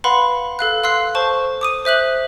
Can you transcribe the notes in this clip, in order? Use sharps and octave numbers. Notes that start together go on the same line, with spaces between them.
B4 F5 F#5 B5 C6
A4 F5 F#6
F5 C6 E6 F#6 C7
C5 A5 C#6
D6 D#6 D#7
C5 E5 F#6 F#7